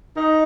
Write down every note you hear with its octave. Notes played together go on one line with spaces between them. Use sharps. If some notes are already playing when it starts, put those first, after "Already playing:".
D#4